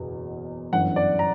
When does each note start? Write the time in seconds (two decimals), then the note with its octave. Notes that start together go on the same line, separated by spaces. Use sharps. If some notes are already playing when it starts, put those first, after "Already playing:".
Already playing: F#1 E2 B2
0.72 G1 F#2 E3 F#5
0.96 D5
1.19 A#5